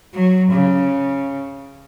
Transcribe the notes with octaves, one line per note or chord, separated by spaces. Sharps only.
F#3
C#3